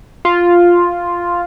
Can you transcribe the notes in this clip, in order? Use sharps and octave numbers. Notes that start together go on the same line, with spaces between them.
F4